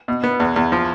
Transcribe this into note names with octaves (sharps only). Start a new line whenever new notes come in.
B2
B3
E2
E2
F3